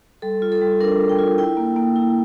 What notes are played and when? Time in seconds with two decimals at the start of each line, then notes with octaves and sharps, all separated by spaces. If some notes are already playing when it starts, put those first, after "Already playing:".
0.22 G3 A4
0.42 F4
0.52 A4
0.62 G3
0.81 D4 A#4
0.99 G3
1.09 G5
1.19 F4
1.38 E4 G5
1.57 A#3
1.76 A#3
1.96 E4